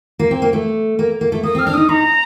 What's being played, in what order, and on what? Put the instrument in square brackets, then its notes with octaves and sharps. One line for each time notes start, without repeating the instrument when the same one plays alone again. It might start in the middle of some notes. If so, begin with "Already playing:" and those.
[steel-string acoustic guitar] A#3
C4
A#3
A3
A#3
A#3
A3
[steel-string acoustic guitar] A#3 [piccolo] D#6
[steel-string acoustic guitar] C4 [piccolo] F6
[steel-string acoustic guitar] D4 [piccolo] F6
[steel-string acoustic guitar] D#4 [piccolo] D#6
[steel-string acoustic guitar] D#4 [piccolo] A#5